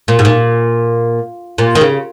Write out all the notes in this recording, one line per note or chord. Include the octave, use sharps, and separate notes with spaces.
A#2
G#2
A#2
A#2
D#3
C#3